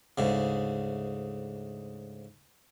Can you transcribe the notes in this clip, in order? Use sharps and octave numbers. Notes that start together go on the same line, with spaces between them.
D2 G#2 C#3